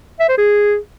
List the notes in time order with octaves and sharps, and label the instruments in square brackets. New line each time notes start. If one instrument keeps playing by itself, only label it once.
[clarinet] E5
C5
G#4